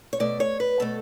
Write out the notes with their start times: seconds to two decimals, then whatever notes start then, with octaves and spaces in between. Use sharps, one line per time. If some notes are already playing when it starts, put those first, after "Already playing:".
0.13 C#5
0.20 B2 A3 D5
0.40 C#5
0.60 B4
0.80 B2 A3 A4